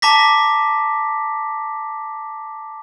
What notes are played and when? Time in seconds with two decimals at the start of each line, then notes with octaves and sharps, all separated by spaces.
0.02 A5 A#5 D6 A#6 B6